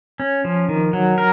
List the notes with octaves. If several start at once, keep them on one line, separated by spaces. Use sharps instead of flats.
C#4
F3
D#3
F#3
A#4